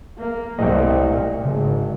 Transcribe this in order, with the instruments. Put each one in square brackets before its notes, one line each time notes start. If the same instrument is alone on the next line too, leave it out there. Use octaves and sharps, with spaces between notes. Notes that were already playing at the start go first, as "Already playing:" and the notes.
[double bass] A#3
[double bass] C2 A3 [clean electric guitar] D#5 G5
[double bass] A#2
[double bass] G#1 [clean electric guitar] C#3